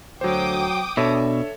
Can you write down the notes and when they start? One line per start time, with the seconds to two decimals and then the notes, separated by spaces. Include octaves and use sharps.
0.21 D2 F#3 C5 G5 D6 D#6
0.97 B2 D4 A4 C#5 E5